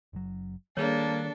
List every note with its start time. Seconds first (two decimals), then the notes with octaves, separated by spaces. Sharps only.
0.13 F#1 F#3
0.77 D#3 G3 A#3 D4 G#4 A4 C#5